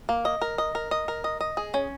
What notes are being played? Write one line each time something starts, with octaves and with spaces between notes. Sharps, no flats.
A#3
D#5
A#4
D#5
A#4
D#5
A#4
D#5
D#5
G#4
C#4